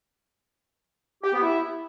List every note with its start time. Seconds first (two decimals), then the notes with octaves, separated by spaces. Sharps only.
1.23 G4
1.33 B3
1.42 E4